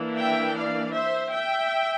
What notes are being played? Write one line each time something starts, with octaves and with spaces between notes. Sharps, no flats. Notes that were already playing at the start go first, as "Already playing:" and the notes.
Already playing: E3 A#3 D4
E5 G5
D5 F5
C5 E5
E5 G5